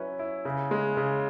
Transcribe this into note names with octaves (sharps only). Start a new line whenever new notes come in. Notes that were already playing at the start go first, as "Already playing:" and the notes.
Already playing: F#3 C#4 E4 B4
E4
C#3
G#3
C#3